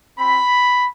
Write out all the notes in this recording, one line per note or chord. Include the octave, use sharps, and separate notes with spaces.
C4 F4 B5